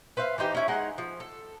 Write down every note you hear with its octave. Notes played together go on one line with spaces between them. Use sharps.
B4 C5 E5 F5
E3 C4 D#4 G4
C#4 E4
G#3 D#4 F#5 G#5
F3
A4